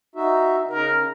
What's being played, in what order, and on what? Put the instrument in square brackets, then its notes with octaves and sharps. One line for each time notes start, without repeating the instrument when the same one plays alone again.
[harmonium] D#4 F#4 E5
[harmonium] C#3 D#4 [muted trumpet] A#4